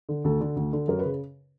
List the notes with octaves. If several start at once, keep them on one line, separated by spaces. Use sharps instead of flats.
D3
D2 A4
D3
D2
D3
F#2 A#4
B4
C#3